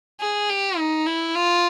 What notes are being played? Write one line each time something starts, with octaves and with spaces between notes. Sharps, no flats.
G#4
G4
D#4
E4
F4